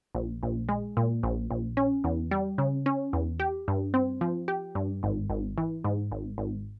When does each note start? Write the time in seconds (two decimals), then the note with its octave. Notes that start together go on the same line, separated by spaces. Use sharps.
0.15 A#1
0.43 A#1
0.69 G#3
0.97 A#2
1.23 A#1
1.51 A#1
1.77 C#4
2.04 E2
2.31 G3
2.58 C#3
2.86 C#4
3.13 E2
3.40 G4
3.68 G2
3.94 C4
4.21 F3
4.48 G4
4.75 G2
5.03 G#1
5.30 G#1
5.58 E3
5.84 G#2
6.12 G#1
6.38 G#1